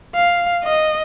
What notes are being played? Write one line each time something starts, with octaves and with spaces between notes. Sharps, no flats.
F5
D#5